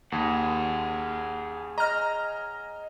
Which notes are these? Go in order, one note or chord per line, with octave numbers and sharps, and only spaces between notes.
D#2 G#4 C#5 F#5
D#5 A#5 F6